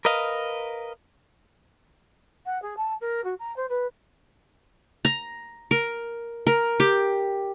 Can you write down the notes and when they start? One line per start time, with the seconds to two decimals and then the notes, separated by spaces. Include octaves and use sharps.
0.05 A#4 B4 D#5 F5
2.46 F#5
2.62 G#4
2.77 A5
3.01 A#4
3.24 F#4
3.39 A#5
3.56 C5
3.69 B4
5.05 A#5
5.71 A#4
6.47 A#4
6.80 G4